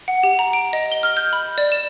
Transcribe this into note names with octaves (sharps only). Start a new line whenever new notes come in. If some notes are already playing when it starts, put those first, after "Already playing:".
F#5
G4
A#5
D7
D#5
G7
F6
G6
B5
D5
E7